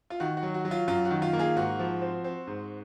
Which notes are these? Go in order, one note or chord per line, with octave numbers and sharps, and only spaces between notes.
F4
D#3 F#4
F#4
F#3
F#4
F#3
F4
F#2 F4
F#4
D#3
F4
A#3
F4 G#4
G#2 F#4
F3
C4
C4
G#2